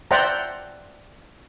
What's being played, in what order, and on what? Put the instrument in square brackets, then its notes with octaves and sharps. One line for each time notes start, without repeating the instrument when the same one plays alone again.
[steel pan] C5 D5 E5 F#5 G5 A#5